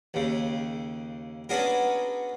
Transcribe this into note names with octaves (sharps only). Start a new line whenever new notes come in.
D#2 C#3
B3 C#4 D4 F#4 G#4 A#4